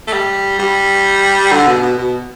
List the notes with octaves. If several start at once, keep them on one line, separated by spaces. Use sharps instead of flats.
A3
G3
G3
D3
B2
B2
B2